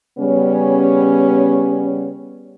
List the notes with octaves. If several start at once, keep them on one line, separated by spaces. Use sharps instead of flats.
C#3 G3 B3 C#4